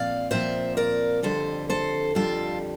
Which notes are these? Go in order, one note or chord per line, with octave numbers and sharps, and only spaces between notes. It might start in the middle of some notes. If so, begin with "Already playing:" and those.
Already playing: A#2 F3 C4 D5 F5
A#2 F3 C4 C5 E5
A#4 D5
F2 D3 G3 A4 C5
A4 C5
F2 D3 G3 F4 A4